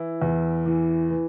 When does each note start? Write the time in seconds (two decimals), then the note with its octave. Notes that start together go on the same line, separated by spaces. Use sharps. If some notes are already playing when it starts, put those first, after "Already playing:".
Already playing: E3 E4
0.22 E2
0.66 E3
1.10 E3